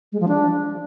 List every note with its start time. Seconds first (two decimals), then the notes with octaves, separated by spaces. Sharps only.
0.12 G#3
0.20 F3
0.28 D4